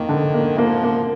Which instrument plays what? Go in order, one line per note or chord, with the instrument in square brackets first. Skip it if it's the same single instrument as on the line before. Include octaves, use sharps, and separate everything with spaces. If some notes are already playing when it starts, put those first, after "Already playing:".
Already playing: [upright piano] F2 A#3 [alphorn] D#3
[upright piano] D3
A#3
[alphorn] F3 [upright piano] A#3
[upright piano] A#3